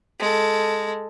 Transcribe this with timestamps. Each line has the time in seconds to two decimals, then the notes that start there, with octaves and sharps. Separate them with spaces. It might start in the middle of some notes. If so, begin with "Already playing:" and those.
0.20 G#3 A4